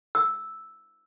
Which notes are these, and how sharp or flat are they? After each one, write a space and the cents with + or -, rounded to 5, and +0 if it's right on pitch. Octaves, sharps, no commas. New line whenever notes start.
E6 -5